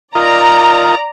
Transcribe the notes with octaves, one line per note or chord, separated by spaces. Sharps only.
F4 A#4 D5 D#5 A#5